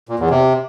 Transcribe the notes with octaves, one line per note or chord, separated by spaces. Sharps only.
A#2
E2
C3